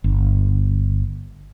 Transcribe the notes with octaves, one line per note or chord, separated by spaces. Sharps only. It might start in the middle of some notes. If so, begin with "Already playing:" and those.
G1